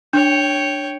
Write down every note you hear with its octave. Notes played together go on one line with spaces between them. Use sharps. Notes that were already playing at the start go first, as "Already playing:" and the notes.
D4 C#5 G5